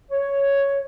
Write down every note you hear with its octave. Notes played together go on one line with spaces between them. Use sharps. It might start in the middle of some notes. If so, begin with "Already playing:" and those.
C#5